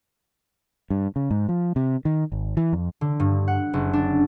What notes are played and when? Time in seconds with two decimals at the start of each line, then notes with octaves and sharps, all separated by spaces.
0.90 G2
1.16 C#3
1.31 G#2
1.49 F3
1.76 C3
2.05 D#3
2.32 G#1
2.57 E3
2.73 F2
3.01 D3
3.20 G2
3.48 F#5
3.73 F#1
3.93 D4